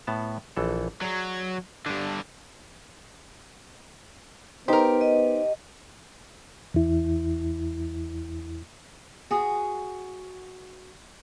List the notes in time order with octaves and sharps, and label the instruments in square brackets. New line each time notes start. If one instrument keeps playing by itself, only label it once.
[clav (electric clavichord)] A2 B3 A5
A#1 E3 A4
[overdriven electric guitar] F#3 [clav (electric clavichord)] G#4 D5
[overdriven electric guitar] G2 D3 [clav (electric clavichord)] D4 G4
[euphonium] B3 [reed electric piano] D#4 C5 [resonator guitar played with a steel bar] G4 A#4
[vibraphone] D#5
[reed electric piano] E2 E4
[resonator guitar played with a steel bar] F#4 G#4